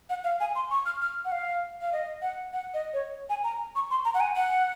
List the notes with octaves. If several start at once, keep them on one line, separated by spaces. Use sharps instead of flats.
F#5
F5
G#5
C6
C#6
F6
F6
F#5
F5
F5
D#5
F#5
F#5
D#5
C#5
G#5
A#5
C#6
C6
A#5
F#5
G#5
F#5